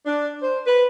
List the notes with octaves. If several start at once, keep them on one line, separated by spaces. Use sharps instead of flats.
D4
C5
B4